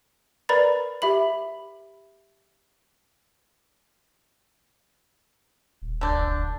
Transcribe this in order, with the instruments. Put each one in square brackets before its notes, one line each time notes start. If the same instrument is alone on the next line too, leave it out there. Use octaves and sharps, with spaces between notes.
[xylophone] A#4 B4 D5 A#5 B5 A6
G4 E5 B5 F#7
[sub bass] D#1
[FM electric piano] G1 D2 G6 [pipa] D3 D4